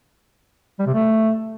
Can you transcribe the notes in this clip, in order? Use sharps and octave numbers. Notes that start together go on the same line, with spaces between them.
G3
C3
A3